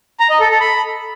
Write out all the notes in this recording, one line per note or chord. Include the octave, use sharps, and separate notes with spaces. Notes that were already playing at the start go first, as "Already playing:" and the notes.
A#5
D#5
A4
A4
B5